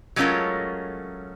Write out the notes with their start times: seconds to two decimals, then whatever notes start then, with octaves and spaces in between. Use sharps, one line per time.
0.16 F#3 G#3 A3 C#4 F4 A#4